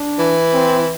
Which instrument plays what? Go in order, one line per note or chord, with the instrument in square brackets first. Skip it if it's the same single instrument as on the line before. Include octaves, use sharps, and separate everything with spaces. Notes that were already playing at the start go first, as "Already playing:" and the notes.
Already playing: [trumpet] D4
[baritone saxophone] E3
[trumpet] C4